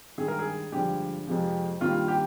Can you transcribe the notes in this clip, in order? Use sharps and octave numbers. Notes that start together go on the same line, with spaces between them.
G2 D#3 G#3 G#4
A#4
G#4
G2 D3 F3 G#3 G4
F2 C3 F3 G#3
G2 D#3 G3 A#3 F4
G4